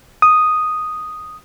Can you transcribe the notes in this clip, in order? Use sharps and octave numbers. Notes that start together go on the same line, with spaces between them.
D#6